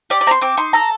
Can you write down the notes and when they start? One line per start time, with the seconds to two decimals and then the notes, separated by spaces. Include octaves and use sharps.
0.10 G4 D5
0.21 D5
0.27 C4 A#5
0.31 C6
0.41 C4 D6
0.57 D#4 C6
0.73 A4 A#5